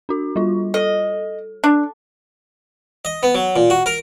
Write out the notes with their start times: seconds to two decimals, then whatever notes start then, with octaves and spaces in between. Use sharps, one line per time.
0.09 D4 F#4
0.36 G3 F4
0.74 A4 D#5
1.64 D4
3.05 D#5
3.23 B3
3.35 F#3
3.56 A#2
3.70 F#4
3.86 A#4